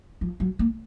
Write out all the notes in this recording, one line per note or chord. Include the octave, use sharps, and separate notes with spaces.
F3
F#3
A#3